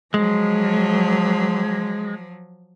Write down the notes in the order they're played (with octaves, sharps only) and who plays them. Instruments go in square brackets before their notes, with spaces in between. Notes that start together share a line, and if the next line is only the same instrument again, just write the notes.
[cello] F3 F#3 [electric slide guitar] G#3